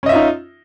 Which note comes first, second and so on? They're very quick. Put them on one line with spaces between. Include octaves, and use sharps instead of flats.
C#4 D#5 E5 F4 D#4